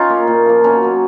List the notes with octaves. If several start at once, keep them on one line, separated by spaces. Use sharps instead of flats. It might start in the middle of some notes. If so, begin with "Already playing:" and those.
Already playing: C#4 D#4 F4
A#3
A#2
F3 A#3
B2 C#4
F#3 A#3